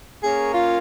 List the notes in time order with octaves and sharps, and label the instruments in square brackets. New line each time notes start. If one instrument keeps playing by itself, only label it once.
[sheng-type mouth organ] A#3 C#4 A#4 C#5 [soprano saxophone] G#4
[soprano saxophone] F4